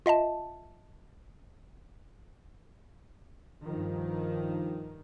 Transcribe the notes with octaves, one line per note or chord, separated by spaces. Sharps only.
F4 D#5 E5 A5
G2 D#3 F3